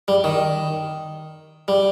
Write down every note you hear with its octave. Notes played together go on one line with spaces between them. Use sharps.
G3
D#3
G3